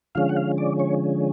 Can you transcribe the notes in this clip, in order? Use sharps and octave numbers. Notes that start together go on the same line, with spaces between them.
D3 F3 G#3 C#4 F5
F#5
F5
D5
C#5